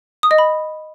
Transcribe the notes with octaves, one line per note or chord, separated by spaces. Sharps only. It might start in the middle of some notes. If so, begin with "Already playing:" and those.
D#6
D#5
B5